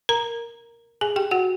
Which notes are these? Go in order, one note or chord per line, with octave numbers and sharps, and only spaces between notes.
A#4 A#5
G#4 G#5
G4 G5
F#4 F#5